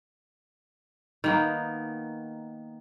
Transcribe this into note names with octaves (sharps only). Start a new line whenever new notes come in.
D#3 A#3 B3